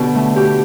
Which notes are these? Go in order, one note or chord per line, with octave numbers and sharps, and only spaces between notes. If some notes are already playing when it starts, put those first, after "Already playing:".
Already playing: B2 D3 D4 G4 A4
A3
B2 G4